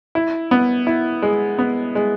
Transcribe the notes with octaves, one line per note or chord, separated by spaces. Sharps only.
E4
B3
E4
G#3
B3
G#3